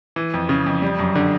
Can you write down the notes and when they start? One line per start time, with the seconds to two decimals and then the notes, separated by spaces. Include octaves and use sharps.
0.16 E3
0.34 F2
0.49 C#3
0.66 F2
0.82 G3
0.99 F#2
1.15 D3